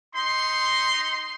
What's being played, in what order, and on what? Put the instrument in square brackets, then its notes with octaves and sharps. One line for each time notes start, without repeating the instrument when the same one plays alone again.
[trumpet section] D#4 C6